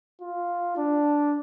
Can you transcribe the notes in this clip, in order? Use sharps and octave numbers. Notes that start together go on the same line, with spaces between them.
F4
D4